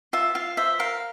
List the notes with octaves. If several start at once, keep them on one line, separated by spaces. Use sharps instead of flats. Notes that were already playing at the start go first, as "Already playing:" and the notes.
F4 E5
F4 F5
C5 E5
A#4 F5